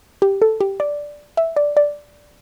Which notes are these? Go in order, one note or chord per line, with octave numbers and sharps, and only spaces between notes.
G4
A4
G4
D5
E5
D5
D5